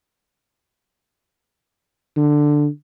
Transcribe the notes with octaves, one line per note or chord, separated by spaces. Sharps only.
D3